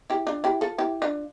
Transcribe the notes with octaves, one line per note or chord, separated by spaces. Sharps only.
E4 G4
D4 F4
E4 G4
F4 A4
E4 G4
D4 F4